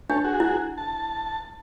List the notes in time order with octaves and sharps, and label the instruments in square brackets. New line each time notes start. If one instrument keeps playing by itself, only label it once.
[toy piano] D4 [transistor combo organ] A4 C#5
[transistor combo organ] F#4 G#4
[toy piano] E4
[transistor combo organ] A5